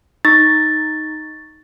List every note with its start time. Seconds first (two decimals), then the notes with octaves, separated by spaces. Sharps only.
0.25 D#4 C#6 A6 A#6